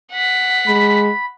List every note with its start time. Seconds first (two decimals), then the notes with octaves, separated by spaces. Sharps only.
0.12 F#5 B6
0.67 G#3 B5